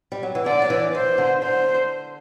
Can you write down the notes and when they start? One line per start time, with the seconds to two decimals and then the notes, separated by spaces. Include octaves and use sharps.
0.12 G3
0.23 F#3
0.35 E3
0.45 D3 D5
0.62 F#3
0.70 E3
0.94 E3 C5
1.18 D3
1.42 D3 C5